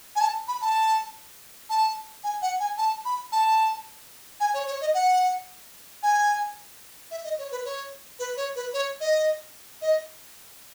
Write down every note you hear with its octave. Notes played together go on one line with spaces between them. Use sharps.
G#5
A5
B5
A5
A5
G#5
F#5
G#5
A5
B5
A5
G#5
C#5
C#5
D#5
F#5
G#5
E5
D#5
C#5
B4
C#5
B4
C#5
B4
C#5
D#5
D#5